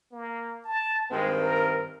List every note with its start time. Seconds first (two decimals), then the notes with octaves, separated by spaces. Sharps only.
0.12 A#3
0.65 A5
1.11 G2 D#3 G#3 C4
1.41 A#4